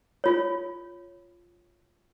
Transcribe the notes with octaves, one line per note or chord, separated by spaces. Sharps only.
F4 C#5